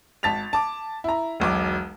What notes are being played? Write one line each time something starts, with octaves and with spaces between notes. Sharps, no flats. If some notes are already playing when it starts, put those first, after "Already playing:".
G#1 A5 A6 B6 F7
A5 D6
E4 A#5
E1 B1 D6